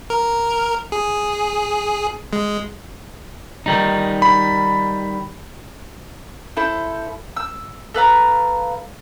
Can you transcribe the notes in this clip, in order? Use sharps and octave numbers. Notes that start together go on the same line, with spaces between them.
A#4
G#4
G#3
D#3 G3 D#4
B5
E4 A4 C5
E6
A4 B4 F5 A#5